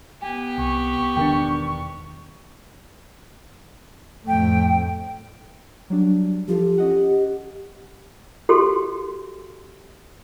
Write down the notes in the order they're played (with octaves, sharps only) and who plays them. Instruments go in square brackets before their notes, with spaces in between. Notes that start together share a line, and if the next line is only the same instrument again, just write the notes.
[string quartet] B3 G4 [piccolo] G#5
[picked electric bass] C2 [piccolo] C#6
[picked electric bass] E1 D#3 [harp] D4 A#4 G5
[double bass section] F2 A2 A3 [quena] G5
[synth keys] F#3 G3 D4
[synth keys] F3 F4 A4 [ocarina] G4
[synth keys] C#4 D#5 F#5
[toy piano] F#4 G4 A4 C6